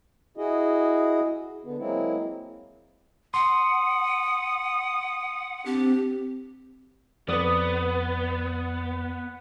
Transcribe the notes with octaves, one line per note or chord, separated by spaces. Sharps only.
E4 F#4 G#4 D#5
D3 B3
F#3 G#3 A#3 C4 E4
F#5 C6 D#6
C4 D4 G4
F2 B3 B4 D5 D#6